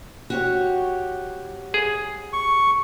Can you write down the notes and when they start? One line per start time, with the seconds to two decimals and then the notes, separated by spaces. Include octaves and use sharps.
0.30 F#4 G4 C#5
1.74 G#4
2.33 C#6